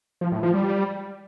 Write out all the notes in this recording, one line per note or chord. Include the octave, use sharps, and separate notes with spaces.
F3
A2
F3
G3